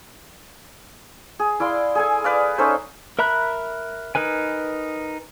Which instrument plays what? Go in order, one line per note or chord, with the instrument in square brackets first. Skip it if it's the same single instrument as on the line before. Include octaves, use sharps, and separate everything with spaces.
[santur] G#4
E4 D5 F5 C6
G#4 A4 G#5
B4 D5 F5
C#4 D#4 A4 C5
[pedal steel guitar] A#4 E5 A#5 B5 F#6
D#4 A#4 B4 G#5